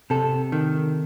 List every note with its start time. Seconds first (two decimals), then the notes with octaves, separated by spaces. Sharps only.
0.10 C3 A4
0.52 D#3